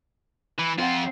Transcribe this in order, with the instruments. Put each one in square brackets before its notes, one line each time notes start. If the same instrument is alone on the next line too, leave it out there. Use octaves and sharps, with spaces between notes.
[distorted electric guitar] E3
[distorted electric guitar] F2 F4 [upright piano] C4 F#5